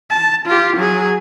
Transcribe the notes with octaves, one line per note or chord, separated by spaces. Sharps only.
A5
F4 G4
F#3 G#4